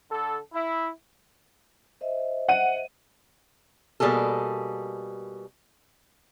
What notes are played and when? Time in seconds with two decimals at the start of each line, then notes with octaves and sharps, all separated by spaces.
0.10 D3 A4
0.53 E4
2.01 C5 D#5 E5
2.49 F#5 D#7
4.00 B2 G3 A#3 G#4 A4